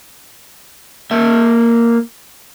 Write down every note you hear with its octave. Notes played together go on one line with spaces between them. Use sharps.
A#3 E5